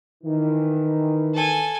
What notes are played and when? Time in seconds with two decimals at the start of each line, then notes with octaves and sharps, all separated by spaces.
0.23 D#3 E3
1.34 A4 G#5